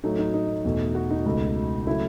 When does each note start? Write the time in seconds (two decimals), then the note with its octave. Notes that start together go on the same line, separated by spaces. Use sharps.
0.04 A2 F#3 A3 D#4
0.18 D#4
0.34 D#4
0.65 E2 B2 A3
0.95 F#4
1.11 D#4
1.26 C#2 B2 A3
1.87 C#3 F#3 A3 E4